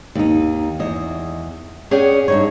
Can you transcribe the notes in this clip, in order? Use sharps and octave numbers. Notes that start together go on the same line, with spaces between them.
D#2 D#4
E2 D#5
C#4 G#4 D5 F#5 G5
G2 D#4 C#5